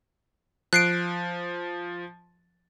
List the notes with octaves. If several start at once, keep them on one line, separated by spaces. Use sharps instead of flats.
F3 F#6 C7 D7